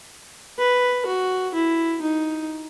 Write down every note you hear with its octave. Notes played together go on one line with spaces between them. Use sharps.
B4
F#4
E4
D#4